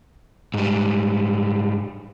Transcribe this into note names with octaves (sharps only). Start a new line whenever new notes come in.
G#2 G3